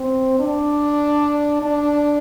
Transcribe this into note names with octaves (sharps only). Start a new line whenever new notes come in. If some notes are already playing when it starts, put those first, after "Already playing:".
Already playing: C4
D4
D4